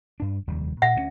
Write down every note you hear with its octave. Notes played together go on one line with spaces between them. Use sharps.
G2 D4
F1 D#2 G3
A#2 E5 F#5
D2 A#3 C#4